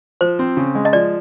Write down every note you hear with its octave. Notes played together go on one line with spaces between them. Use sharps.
F3 C5
C4
C#3
G#3
D#5
F3 D5